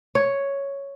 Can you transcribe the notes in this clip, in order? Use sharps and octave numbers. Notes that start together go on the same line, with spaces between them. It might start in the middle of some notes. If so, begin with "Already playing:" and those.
C#5